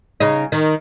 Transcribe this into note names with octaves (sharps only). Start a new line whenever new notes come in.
C#3 D#4
D#3